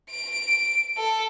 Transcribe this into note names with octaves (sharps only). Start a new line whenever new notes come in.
D7
A4